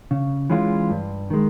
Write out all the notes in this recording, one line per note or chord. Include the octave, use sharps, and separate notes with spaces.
C#3
E3 G#3 C#4 F4
G2
D#3 G#3